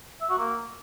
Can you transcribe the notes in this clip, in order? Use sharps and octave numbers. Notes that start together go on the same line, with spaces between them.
E5
F#4
A#3